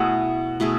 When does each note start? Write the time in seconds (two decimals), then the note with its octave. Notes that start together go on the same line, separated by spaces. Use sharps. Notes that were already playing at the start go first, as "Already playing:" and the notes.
Already playing: B2 A3 E4 G#4 F#5
0.60 B2 A3 E4 G#4